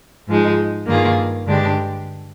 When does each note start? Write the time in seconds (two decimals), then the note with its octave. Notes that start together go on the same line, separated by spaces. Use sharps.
0.27 G#2 F3 G#3 D#4
0.87 G2 D#3 A#3 F4 G#4
1.46 G2 D3 G#3 D4 G4